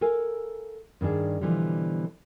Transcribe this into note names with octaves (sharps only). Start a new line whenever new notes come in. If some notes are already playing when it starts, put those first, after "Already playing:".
A4 A#4 F5 G#5
G2 D#3 D4 G#4
B2 D3 E3 F3 G3